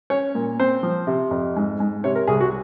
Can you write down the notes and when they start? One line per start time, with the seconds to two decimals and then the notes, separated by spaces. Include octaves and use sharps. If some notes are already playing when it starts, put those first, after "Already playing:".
0.10 C#4 C#5
0.35 A#2
0.60 C4 C5
0.83 F3
1.07 C3
1.31 F2
1.56 G#2
1.80 G#2
2.04 C3 C#5
2.15 A#4
2.28 C2 G#4
2.41 F#4